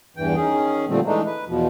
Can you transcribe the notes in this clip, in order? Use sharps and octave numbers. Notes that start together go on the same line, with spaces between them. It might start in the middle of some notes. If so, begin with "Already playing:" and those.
E2 G2 E3 G5
D#3 C#4 G#4
A#2 D3 F3 G3 A3 C4
E3 G#3 A3 D4 D#4
B4
E2 B2 F3